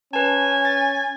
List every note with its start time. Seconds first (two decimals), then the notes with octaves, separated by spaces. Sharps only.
0.13 C#4 B4 G#5 A5
0.65 A6